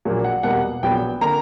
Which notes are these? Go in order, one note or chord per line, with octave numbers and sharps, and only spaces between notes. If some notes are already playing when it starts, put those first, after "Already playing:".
A#1 A#2 F#3 A#3
F#5
E2 B2 G3 A#3 F#5
A#1 A#2 F#3 B3 G5
D3 A#3 A#5